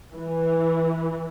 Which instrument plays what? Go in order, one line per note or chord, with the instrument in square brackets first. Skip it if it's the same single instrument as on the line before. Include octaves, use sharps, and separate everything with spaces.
[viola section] E3